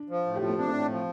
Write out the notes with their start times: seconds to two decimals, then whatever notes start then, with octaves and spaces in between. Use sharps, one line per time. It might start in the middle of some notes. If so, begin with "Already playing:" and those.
Already playing: D4
0.10 F3
0.26 A2
0.36 G4
0.41 F3 F4
0.49 A3
0.58 C4 D4
0.68 A3
0.73 A2 C4
0.90 F3